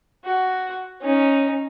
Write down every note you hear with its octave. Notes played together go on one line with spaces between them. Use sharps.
F#4
C#4 D#4